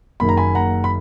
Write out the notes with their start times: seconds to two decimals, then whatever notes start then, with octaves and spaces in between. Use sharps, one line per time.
0.20 F#1 F#2 D#3 A#3 B5
0.29 A#5
0.37 G#5 B5
0.55 F#5 A#5
0.84 B5